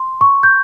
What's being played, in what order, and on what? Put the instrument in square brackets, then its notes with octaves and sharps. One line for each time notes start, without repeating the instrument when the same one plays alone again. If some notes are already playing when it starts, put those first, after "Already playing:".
Already playing: [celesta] C6
C#6
G6